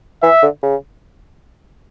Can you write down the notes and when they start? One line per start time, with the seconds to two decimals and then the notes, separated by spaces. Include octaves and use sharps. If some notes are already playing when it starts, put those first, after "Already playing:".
0.22 E3 E5
0.42 D3
0.62 C#3